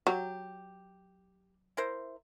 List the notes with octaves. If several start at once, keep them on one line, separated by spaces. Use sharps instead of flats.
F#3 G4
E4 A#4 C5